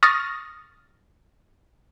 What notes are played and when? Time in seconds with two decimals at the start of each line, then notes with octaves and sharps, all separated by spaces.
0.03 C#6 D#6 F6 A6 A#6